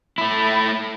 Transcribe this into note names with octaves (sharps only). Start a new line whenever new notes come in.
A3 E4